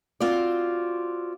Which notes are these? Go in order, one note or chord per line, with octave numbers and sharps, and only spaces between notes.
C4 F4 F#4 D5